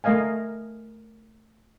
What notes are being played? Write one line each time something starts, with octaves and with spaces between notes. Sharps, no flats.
A3 A#4 D#5 F5 G#5